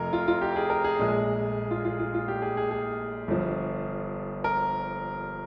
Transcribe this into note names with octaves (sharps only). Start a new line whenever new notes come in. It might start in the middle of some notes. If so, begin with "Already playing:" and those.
Already playing: F1 F2 A#4
F4
F4
G4
G#4
A#4
G#4
A#1 A#2 G#3
F4
F4
F4
F4
G4
G#4
G#4
G#4
G1 G2 F3
A#4